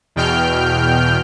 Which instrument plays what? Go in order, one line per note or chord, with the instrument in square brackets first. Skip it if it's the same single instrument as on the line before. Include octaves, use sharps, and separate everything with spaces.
[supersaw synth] E2 B2 G5 F6 G6